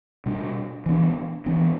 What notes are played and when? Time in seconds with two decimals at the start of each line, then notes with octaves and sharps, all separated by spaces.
0.26 B2 G3 D4
0.86 E3 B3 D4
1.46 E3 B3 D4